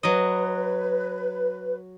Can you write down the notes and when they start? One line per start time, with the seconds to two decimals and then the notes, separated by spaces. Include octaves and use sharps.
0.03 F#3 B4 D#5